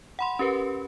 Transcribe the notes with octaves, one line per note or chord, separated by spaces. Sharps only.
F#5 B5 C6
C#4 G4 A#4 B4